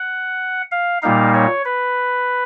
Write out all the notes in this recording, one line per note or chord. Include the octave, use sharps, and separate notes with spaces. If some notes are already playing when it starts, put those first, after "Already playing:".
Already playing: F#5
F5
A#2 G3 A#3 D#4 F5
C#5
B4